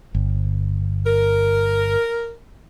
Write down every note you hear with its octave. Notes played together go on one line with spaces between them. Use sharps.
G1
A#4